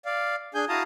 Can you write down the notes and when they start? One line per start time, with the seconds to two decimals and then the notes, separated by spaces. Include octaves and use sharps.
0.05 D5 F5
0.55 D4 G#4 G#5 G6
0.69 E4 F#4 F5 A5 A#5 D#6